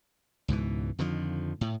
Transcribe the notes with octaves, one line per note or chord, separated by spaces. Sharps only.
C#2 G#2 B2 E3
F2 D3 D#3 F3
A2